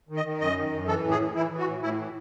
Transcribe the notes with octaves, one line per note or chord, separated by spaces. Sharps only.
D#3
D#5
D#3
F#2 D#5
D#3
F#2
E3 A4
A2
G#4
E3
E3 E4
E3
F#4
A2
A2 E4
E3